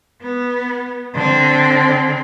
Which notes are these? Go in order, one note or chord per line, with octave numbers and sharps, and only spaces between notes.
B3
D3 C4